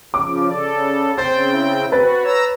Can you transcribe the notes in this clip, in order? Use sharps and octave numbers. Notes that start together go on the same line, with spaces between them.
C#3 F3 D6
C#3 A4 D5
C#3 C4 C5 G5 A6
E4
C4 F#4 B4 A6
C#5 A#5 E6